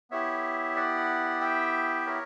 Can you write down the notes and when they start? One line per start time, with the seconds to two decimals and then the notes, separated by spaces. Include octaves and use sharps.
0.10 B3 E4 G4 C#5 E5
0.76 D5 F#5
1.40 E5 G5
2.06 A#4 C#5